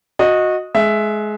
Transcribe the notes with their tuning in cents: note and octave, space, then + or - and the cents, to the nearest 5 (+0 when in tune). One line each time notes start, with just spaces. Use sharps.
F#4 -20 D#5 +0
G#3 +25 E5 +5